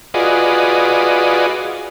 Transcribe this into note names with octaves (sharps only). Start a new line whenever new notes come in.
F4 F#4 G#4 B4 D5 D#5